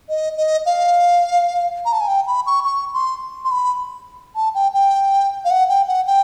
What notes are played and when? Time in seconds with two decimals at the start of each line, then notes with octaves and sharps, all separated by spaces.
0.09 D#5
0.37 D#5
0.66 F5
1.85 A#5
1.93 A5
2.01 G#5
2.08 G5
2.27 B5
2.46 C#6
2.65 C#6
2.94 C6
3.45 C6
3.51 B5
4.36 A5
4.55 G5
4.74 G5
5.45 F5
5.51 F#5
5.69 G5
5.88 F#5
6.07 G5